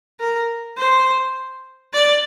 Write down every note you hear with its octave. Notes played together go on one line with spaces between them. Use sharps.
A#4
C5
D5